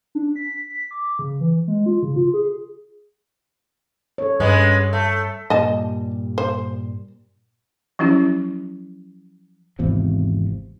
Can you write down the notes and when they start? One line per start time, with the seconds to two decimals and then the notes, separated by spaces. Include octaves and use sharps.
0.15 D4
0.36 B6
0.70 B6
0.91 D6
1.19 C#3
1.41 E3
1.68 G#3
1.86 F4
2.03 C#3
2.16 F4
2.33 G#4
4.18 A4 C#5
4.40 G2 G#3 B3 C#4
4.93 A3
5.50 G2 A#2 G3 D#5 A5
6.38 C5
7.99 F3 F#3 C#4 E4 G4
9.79 G#1 E2 C3 F3